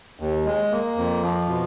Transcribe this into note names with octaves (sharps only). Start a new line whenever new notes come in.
D#2
G#3
A#3
F2
F3
B2